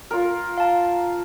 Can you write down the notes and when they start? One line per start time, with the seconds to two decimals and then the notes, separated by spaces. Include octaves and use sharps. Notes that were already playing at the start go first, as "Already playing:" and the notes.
0.11 F4 A#4
0.58 F5 A5